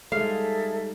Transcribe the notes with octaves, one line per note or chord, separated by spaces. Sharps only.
G3 G#3 D#4 G#4 A4 E5 F5